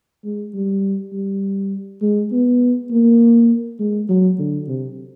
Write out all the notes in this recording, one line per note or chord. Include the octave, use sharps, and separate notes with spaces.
G#3
G3
G3
G#3
B3
A#3
G#3
F#3
D3
C3